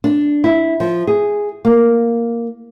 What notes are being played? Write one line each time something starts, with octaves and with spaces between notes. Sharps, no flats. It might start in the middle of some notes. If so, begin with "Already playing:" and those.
D4
E4
F3
G#4
A#3